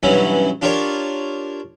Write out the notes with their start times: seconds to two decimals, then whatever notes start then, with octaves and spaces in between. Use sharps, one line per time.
0.03 B1 G2 E3 F#3 C#4 E4
0.62 D4 F4 G4 A#4 C#5 D5